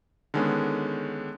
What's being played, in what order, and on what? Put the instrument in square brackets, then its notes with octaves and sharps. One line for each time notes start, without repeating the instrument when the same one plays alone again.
[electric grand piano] D3 D#3 G#3 B3 C#4